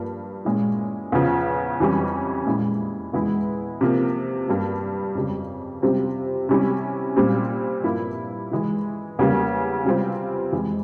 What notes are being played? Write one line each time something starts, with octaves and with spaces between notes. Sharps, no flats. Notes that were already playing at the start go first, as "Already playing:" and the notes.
Already playing: G2 F3 A#3
A#2 G#3 C#4 E4
E2 C#3 F3
F2 E3 G3 C#4
A#2 G#3 E4
E2 E3 G#3 E4
C3 F3 A#3
G2 G3 A#3
F2 C#3 G3
C3 G3 C4 F4
C3 G3 C#4 E4
A#2 G3 C4
G2 F3 A#3 E4
E3 G#3 E4
E2 C#3 G3 A#3
C3 G3 C4 F4
F2 E3 G#3